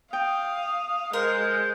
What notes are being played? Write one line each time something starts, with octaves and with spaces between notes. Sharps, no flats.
F5 G5 D#6
G#3 A#4 C5